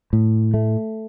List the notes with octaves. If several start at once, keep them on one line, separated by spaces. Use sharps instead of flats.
A2
A3